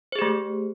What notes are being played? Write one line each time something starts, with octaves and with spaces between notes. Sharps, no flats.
A3 G4 G#4 C5